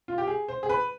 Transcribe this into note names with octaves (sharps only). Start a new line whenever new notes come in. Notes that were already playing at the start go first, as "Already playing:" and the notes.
F4
G4
G#4
C5
G#4
B4